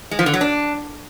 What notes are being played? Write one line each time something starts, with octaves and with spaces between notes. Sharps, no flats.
G#3
F3
D3
F#3
D4